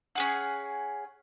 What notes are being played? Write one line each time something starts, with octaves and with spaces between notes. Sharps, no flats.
C#4 G#4 F#5